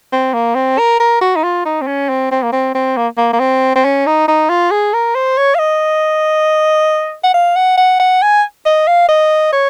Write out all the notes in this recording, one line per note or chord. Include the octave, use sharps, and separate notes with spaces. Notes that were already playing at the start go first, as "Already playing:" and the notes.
C4
A#3
C4
A#4
A#4
F#4
D#4
F4
D#4
C4
C#4
C4
C4
A#3
C4
C4
A#3
A#3
A#3
C4
C4
C#4
D#4
D#4
F4
G#4
A#4
C5
C#5
F5
D#5
F#5
F5
F#5
F#5
F#5
G#5
D#5
F5
D#5
C#5